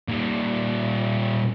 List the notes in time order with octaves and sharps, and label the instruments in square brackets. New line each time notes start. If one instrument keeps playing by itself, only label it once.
[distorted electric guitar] A#2 G3